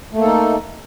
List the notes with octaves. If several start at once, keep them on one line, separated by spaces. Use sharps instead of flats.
A3 A#3 D#4 A4